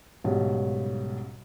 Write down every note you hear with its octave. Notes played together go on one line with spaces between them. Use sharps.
B1 G#2 C#3 G3